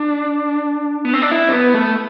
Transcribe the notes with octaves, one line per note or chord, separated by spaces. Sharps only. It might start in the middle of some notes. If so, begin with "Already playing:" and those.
Already playing: D4
B3
C4
D4
E4
C4
B3
A3